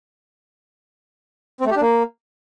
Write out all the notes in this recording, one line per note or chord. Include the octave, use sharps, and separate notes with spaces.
C4
A3
G4
D4
A#3